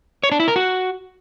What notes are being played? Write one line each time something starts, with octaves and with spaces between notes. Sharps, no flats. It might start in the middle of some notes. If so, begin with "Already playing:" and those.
C#5
D4
E4
A#4
F#4